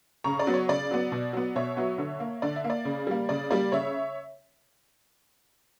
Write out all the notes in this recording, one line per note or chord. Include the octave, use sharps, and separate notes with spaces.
C#3 A#5 C#6
D5
F#3 B3
C#5
C#3 D5
F#3 B3
B2
F#3 B3
B2 C#5 E5
F#3 B3
D3
A#3
D3 D5
E5
A#3
D5
C#3
G3 A#3
C#3 D5
G3 A#3 D5
C#3 C#5 E5